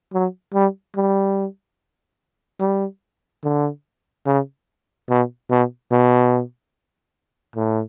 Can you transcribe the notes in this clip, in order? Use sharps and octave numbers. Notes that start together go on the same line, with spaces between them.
F#3
G3
G3
G3
D3
C#3
B2
B2
B2
A2